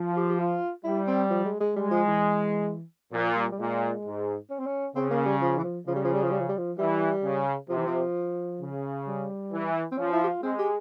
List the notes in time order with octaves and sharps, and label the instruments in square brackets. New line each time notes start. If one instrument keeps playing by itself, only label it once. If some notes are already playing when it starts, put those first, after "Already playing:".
Already playing: [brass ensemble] F3
[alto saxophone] F4
G4
G4
F4
[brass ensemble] G3 [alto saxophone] E4
[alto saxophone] C4
F3
G#3
G#3
[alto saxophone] G3 [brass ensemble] G#3
[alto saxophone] F3
E3
[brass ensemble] A#2 [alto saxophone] F3
[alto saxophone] G3
G3
[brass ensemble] A#2 [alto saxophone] G#3
[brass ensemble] G#2
[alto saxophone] C#4
C4
C#4
[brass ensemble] C#3 [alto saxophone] C4
[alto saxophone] A#3
G3
F3
E3
F3
[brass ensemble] C#3 [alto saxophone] F3
[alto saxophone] G3
F3
G3
F3
G3
F3
G3
F3
[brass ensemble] E3 [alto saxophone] G3
[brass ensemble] C#3
[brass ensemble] C3 [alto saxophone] F3
[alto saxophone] E3
F3
[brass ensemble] C#3
[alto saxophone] G3
[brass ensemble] E3
[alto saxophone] C4
[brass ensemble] F3 [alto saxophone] C#4
[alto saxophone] E4
G4
F4
[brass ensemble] G#3 [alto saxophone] C4
[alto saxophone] G4